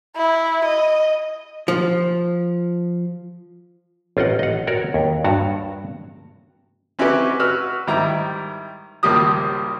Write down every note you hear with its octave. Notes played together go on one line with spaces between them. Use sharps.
E4
D#5
F3
A1 F4 A#4 D#5 F#5
D#5 F#5
F#4 A#4 C#5 D5
D#2
G2 F#4 A5 A#5
C4 C#4 E4 F#4 G4 B4
F#4 B4 E6 F6
G#2 D#3 G3 E4 A#5
G#1 C#2 G3 A#3 G4 D#6